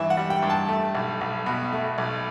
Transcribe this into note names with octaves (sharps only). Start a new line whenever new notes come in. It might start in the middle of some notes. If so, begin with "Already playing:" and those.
Already playing: G2 E3 E5
F#5
G3
G5
G2
A5
A3
B1
B1
B2
A3
B1